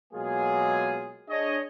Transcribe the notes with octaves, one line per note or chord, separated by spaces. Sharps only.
B2 F#3 G#3 A#3 F4 G#4
D4 G#4 C#5 D#5